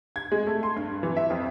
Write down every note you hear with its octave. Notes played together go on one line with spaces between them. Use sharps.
G#6
G#3
A3
C6
G2
E3
E5
F2